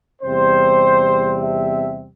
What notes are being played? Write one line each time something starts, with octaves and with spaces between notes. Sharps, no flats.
E2 C3 G3 C4 C5
E5